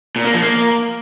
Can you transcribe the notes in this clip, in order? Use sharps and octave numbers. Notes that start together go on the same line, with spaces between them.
A#2
A#3
F3
A#3